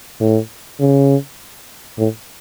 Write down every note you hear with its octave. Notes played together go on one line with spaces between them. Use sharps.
A2
C#3
A2